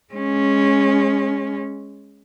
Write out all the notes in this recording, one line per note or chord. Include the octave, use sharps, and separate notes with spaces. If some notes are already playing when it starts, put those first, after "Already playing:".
G#3 C#4